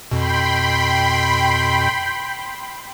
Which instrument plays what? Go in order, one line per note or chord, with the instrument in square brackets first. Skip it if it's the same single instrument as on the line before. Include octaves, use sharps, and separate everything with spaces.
[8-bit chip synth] F2 B2 [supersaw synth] G5 B5 C6